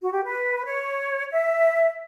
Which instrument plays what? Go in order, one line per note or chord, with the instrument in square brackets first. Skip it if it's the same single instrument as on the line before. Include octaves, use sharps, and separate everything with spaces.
[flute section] F#4
G4
B4
C#5
E5